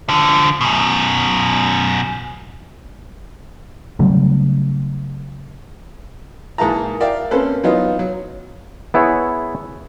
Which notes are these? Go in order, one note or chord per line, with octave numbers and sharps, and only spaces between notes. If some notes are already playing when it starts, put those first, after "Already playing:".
D3 F3
F#2 B2
C#3 F#3 G3 A3
G#2 E3 A#3 E5 A5 A#5
A#4 D5 E5 F5 G5
A#3 C4 C#4 A4 B4 C5
E3 F#3 B3 D#4 F4
F#3
B3 E4 G#4 C#5